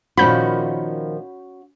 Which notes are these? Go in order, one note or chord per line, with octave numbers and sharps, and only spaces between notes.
A#2 D#3 F3 C#4 F#4 B5 G6